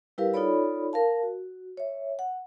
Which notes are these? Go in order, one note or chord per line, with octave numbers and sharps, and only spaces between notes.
G3 E4 G4 A#4 B4 F5
D#4 F4 A4 C#5 D5 B5
A#4 F5 A5
F#4
C#5 E5
F#5